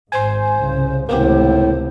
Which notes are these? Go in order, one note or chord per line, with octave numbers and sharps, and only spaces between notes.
G#1 G#2 C5 G#5 C6
C2 C#3
C#2 A2 C3 D#3 A#3 B3 G4 C5